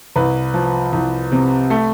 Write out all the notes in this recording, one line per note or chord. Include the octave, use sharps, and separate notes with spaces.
C2 B4
F3
C2
C3
A3